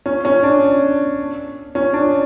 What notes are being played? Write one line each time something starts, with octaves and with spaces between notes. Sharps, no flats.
C#4
C#4
D4
C#4
D4